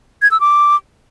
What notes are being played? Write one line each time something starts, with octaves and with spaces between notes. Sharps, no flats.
G#6
E6
D6